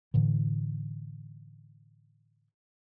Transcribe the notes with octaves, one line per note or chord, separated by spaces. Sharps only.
A2 D3 E3